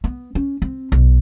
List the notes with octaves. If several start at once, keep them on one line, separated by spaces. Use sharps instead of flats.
B3
C#4
C4
B1